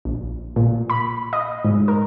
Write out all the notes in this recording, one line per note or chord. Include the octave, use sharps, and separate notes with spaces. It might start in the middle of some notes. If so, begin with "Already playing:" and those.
A#1
A#2
B5
D#5
G#2
A#4